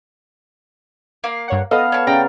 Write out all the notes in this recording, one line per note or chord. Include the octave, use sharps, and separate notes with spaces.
A#3 F5
G2 C#5 F#5
B3 A4 D#5 F5 D#6
C#5 A5
C#3 D5 G5 A#5